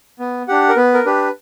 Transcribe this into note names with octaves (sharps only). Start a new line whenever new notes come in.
B3
D4 G4 F#5
A#4
B3 B4
A#4
D4 G4 B4